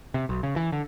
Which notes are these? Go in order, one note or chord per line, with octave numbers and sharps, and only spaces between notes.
C3
B1
C#3
E3
D3